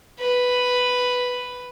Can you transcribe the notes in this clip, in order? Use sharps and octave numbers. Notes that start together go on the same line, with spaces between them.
B4